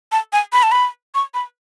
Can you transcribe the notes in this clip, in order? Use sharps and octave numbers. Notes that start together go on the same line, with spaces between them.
A5
G#5
B5
A5
B5
C#6
B5